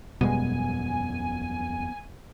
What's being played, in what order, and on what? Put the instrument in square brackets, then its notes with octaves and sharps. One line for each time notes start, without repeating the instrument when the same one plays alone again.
[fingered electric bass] E1 F#2 [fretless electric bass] B2 G3 G#3 [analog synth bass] B3 [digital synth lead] G#5